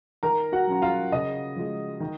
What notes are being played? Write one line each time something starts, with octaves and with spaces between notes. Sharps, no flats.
D#3 A#4 A#5
F#4 F#5
F#3 C#4 F4
F4 F5
C#3 D#5
F3 G#3
D#3